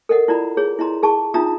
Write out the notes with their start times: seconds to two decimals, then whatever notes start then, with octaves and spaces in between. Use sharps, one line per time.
0.09 A4 A#4 D#5 F#5
0.28 E4 F4 D5 A#5 B5
0.57 G#4 C#5
0.79 E4 D#5 A#5 C6
1.02 E4 G#4 A5 C#6
1.34 D4 D#4 F4 E5 A#5 D#6